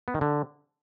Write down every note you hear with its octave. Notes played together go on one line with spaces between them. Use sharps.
B3
D#3
D3